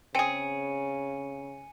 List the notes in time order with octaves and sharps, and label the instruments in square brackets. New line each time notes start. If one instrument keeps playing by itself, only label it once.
[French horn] C#3 [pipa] C4 G#4 [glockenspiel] G#5 C#7 D#7